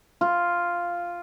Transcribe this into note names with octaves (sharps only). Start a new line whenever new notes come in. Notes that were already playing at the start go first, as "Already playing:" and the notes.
F4